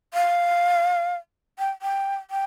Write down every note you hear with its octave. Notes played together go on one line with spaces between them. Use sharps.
F5
G5
G5
G5